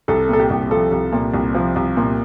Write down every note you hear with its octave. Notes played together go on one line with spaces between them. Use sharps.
C2 A4
A#2 A4
G4
C2
F3 A4
C2
A#2
C2
F3
C2
A#2